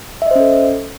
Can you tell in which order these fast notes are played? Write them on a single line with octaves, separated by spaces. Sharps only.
E5 D#5 C5 C#4 A4